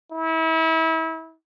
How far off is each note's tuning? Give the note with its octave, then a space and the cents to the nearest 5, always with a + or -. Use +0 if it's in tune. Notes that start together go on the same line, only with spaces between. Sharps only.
E4 -35